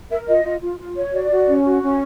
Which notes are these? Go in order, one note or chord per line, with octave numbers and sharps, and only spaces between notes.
A#4 E5
F4 D#5
F4
F4
F4
C#5
F#4 D5
F#4
C#4
F#4
C#4